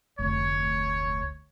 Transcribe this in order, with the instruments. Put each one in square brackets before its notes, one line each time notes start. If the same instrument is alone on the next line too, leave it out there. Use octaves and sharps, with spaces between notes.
[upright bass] F1 D2 [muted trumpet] C#5